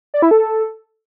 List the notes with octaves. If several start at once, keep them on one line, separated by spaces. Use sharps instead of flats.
D5
E4
A4